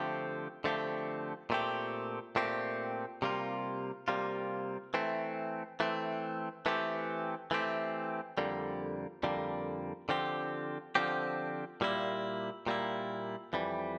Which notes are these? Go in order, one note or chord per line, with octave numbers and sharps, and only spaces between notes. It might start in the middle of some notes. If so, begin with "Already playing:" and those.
Already playing: D3 F3 A3 C4 G4
D3 F3 A3 C4 G4
A#2 A3 C4 G4
A#2 A3 C4 G4
C3 G3 A#3 F4
C3 G3 A#3 F4
E3 A3 C4
E3 A3 C4
E3 A3 C4 G4
E3 A3 C4 G4
F2 D3 G3 A#3
F2 D3 G3 A#3
D3 F3 C4 G4
D3 F3 C4 G4
A#2 G3 A#3 E4
A#2 G3 A#3 E4
F2 E3 G3